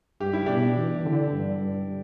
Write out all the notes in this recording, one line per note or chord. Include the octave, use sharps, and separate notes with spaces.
G2 G4
E4
B2 D4 G4
E3
D3
G2
G2